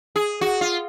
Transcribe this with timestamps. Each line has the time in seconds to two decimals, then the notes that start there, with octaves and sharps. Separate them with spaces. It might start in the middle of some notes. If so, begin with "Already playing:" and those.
0.16 G#4
0.41 F#4
0.61 F4